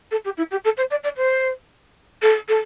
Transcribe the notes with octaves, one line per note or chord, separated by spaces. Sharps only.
A4
G4
E4
G4
A4
C5
D5
D5
C5
A4
A4